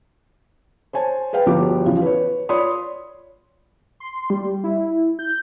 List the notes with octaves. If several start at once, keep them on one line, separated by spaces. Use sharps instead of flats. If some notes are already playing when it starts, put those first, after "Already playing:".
C5 C#5 G#5 A5
G#4 B4 F5 G5
G1 F3 G3 F#4 D6
E2 C#3 F3
B4 C#5
F4 C#5 D5 B5 C6 D#6
C6
G3
E4
G6